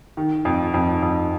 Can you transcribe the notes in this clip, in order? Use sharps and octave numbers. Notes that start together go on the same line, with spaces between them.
D#3
F2
F2
F2